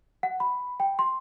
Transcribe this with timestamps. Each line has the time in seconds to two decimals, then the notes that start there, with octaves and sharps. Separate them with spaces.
0.23 F#5
0.40 B5
0.80 G5
0.99 C6